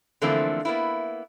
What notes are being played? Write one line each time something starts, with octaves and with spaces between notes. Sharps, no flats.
D3 E3 F3 A3 A#3 C4
A#3 B3 E4